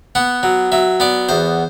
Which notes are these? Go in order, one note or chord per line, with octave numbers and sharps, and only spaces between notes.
B3 F#5
F#3
F#3 E5
B3 D5
E2 C5